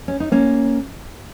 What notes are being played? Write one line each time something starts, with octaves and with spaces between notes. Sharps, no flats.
C#4
D#4
A#3 C#4